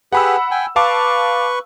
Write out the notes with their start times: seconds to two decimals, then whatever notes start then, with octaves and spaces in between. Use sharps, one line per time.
0.13 G4 G#4 B4 F#5 B5 E6
0.51 G5 G#5
0.76 B4 F5 A5 C#6 D6